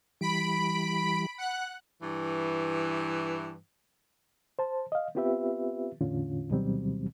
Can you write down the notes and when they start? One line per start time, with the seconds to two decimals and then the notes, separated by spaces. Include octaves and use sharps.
0.21 E3 G3 B5 B6 D7
1.38 F#5 F#6
2.02 G2 E3
4.59 C5 A5
4.92 D#5 F5
5.15 B3 C4 F4 G4 B4 E5
6.01 E2 A2 D3 C#4 F4
6.50 D2 B2 D#3 F#3 G3 C4